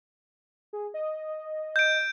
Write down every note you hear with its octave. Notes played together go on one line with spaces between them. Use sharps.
G#4
D#5
G6 D7